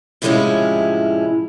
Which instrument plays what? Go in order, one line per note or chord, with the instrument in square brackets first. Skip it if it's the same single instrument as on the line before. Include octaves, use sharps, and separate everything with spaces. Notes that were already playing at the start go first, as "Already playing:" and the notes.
[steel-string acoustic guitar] A2 C3 F3 G#3 C#4 E4